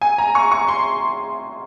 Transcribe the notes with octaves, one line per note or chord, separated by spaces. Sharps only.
G#5
A#5
C#6
C#6
C6